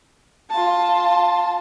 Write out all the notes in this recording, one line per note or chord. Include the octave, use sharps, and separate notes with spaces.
F4 A5